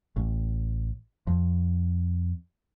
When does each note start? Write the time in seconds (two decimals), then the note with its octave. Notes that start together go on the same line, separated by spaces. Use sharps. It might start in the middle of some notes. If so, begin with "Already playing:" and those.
0.16 A1
1.27 F2